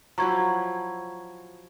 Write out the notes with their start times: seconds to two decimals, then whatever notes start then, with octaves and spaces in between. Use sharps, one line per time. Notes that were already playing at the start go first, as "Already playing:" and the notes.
0.18 F3 F#3 E4 A#5 C#6 G#6